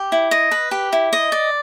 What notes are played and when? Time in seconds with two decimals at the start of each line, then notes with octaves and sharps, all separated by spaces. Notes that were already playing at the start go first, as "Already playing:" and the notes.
Already playing: G4
0.12 E4
0.31 D#5
0.51 B4
0.71 G4
0.92 E4
1.13 D#5
1.32 D5